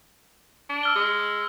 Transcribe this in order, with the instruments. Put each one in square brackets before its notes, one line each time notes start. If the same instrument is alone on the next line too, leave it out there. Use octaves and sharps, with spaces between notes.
[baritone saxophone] D4
[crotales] E6 F6 G7
[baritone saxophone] G#3